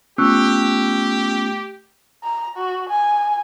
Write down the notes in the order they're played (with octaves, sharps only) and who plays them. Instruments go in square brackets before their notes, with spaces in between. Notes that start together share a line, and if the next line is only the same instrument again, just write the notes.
[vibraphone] A3 [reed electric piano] B3 C#4 F4 [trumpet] G4 [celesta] C#6 E6 F#6
[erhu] A#5
F#4
G#5